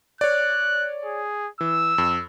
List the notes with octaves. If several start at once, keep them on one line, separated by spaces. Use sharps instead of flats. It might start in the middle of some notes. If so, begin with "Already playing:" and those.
C#5 D5 F#6
G#4
E3 E6
F2